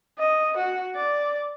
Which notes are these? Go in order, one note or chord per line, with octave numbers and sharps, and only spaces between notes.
D#5
F#4
D5